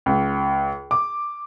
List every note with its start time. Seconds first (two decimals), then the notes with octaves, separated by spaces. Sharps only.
0.06 C#2
0.91 D6